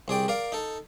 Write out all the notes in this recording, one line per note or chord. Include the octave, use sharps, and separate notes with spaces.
C2 G#4 D5 G5
A#4 D5 F5
D#4 A4